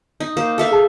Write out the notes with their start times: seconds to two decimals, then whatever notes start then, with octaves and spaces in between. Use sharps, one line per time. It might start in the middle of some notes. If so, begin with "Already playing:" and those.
0.20 D#4
0.37 A#3 C5
0.58 A4 E5 F5
0.71 G#4 A5